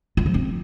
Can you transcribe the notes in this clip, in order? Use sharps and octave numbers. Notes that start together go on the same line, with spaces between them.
F4
F3
C4